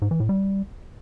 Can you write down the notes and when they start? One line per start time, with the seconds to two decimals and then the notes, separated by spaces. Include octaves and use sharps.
0.02 G#2
0.11 E3
0.20 A2
0.29 G3